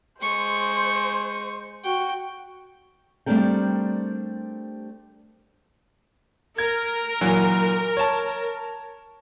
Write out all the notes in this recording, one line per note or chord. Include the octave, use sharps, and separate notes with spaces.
G#3 C5 C#6
F#4 G5
G3 A3 C4 D4 A#4 G5
A#4 G#6
A#2 E3 F#3
C#5 A5